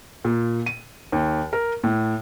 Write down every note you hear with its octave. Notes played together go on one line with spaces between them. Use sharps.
A#2
D#7
D#2
A#4
A2